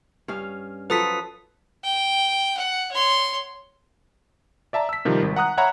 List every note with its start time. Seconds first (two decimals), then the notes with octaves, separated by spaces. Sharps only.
0.28 G2 C#4 F5
0.90 F3 F#3 A4 B4 D#6 B6
1.84 G5
2.57 F#5
2.91 C#5 C6
4.73 D5 E5 A5 A#5
4.89 E6 B6
5.05 C3 D#3 F3 G3
5.22 G#1
5.36 F#5 A#5 D#6 F#6
5.57 C#5 E5 F#5 A#5 B5